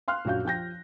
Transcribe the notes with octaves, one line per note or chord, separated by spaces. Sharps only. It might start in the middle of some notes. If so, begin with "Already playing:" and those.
F5 C6 F6 F#6
A#1 F#2 F#4 F5 G6
F3 G5 G6 A#6